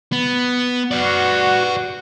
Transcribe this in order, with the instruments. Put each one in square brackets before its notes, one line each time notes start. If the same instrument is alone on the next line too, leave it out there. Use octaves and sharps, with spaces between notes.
[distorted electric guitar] B3
[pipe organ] F#4 [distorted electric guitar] B4 D5